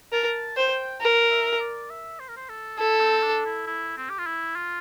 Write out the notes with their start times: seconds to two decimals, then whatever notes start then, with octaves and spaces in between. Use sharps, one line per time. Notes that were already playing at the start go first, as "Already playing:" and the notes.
0.12 A#4 A5
0.57 C5 G5
1.01 A#4
1.30 E5
1.60 D5
1.90 E5
2.20 C5
2.29 A#4
2.37 C5
2.49 A4
2.79 E4 A4
3.01 C4
3.23 D4
3.46 E4
3.67 E4
3.97 C4
4.10 G4
4.18 F4
4.27 E4
4.56 F4